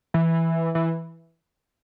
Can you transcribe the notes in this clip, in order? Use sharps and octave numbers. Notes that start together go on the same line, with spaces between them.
E3
E3